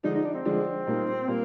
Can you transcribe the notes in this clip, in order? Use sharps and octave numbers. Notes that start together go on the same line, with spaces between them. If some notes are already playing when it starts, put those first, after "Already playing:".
D3 F3 G#3 D4 D#4
D#4
D4
C4
D3 F3 G#3 D4
A#2 G3 A#3 D#4
A#2 G3 A#3